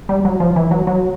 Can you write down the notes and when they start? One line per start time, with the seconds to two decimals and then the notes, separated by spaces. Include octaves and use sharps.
0.09 G3
0.25 F#3
0.40 F3
0.56 E3
0.71 F#3
0.87 F#3